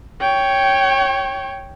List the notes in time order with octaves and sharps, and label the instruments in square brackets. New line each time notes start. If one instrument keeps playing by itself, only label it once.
[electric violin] C#5 G5